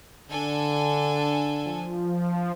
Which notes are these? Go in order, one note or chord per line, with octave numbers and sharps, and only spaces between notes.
D3 D4 A4 G#5
F3